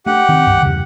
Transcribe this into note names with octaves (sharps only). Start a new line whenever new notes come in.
A3 D4 G4 F#5
D#3 C4
C2 G2
E2 G2 C#3